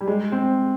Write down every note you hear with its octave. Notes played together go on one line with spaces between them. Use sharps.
G3
G#3
C4